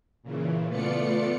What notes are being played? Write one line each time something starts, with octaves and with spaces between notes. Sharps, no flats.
A#2 C#3 E3
A3 B3 F4 D5 C#7